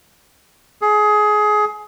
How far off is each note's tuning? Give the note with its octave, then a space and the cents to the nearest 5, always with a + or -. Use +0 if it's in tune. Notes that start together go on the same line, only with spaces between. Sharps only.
G#4 +20